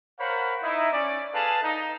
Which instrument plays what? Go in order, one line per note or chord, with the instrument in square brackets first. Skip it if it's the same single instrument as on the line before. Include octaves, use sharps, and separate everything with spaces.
[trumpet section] A#4 C5 C#5 F5 F#5 B5
D#4 E4
C#4 D5
G#4 A4 B4 F5 A5
D#4